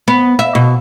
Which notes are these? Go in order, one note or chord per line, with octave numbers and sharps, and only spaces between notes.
B3
E5
B2